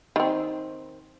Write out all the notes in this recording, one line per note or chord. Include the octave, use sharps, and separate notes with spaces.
D#3 C4